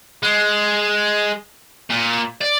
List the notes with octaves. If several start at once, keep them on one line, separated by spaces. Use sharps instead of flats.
G#3
A#2
D5